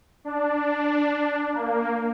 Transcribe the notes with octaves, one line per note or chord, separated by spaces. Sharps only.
D4
A#3